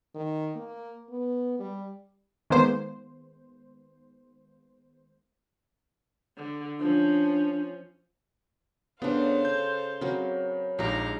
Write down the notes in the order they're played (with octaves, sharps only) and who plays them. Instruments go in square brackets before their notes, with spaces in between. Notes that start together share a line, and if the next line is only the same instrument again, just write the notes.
[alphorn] D#3
A#3
B3
G3
[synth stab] D#3 G#3 A#3 B3 C5
[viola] D3
[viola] F3 C#4 [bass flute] D4
[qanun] C#3 G4 [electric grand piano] B3 D4 [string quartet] A4 C5 F5
[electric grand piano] G6
[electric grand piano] C#3 [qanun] F#3 A#3 C4
[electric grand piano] A#1 [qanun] G#3 D#4 [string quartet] G4 F5 A#5